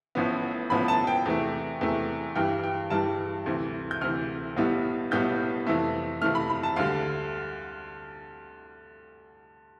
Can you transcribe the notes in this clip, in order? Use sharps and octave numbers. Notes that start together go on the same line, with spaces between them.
A1 A2 F3 B3
A1 A2 F3 B3 B5
A5
G5
E2 C3 E3 A3
E2 C3 E3 A3
G2 E3 G3 G5
G5
G2 E3 G3 A5
D2 C3 E3
G6
D2 C3 E3 F6
B1 A2 G3 B3 E4
B1 A2 G3 B3 E4 G6
F2 C3 E3 A3
F2 C3 E3 A3 F6
B5
B5
A5
D2 D3 G3 F5